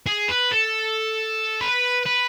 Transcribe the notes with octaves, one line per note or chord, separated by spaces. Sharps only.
G#4
B4
A4
B4
B4